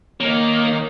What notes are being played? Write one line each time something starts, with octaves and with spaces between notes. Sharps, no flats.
A#3 A#4 C#5 D#5